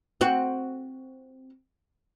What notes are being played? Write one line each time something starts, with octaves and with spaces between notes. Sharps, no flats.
C4 F#4